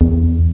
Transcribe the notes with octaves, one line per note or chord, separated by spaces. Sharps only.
E2